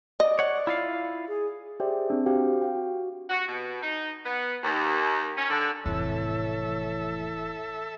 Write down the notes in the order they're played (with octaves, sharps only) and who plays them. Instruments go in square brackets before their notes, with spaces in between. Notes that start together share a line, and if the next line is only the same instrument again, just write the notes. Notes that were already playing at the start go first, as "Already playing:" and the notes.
[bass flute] D5 [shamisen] D#5
[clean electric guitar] C#5 F#5
E4 F4 F5
[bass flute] G#4
[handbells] G4 G#4 C5 D5 E5 G5
C4 D4
F#4 G4 C5 F5 G5
F5 G5
F#4
[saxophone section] F#4
B2
D#4
B3
D#2
C#4
D3
[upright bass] F1 A2 [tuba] E3 [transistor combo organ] A4 E5 [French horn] C#5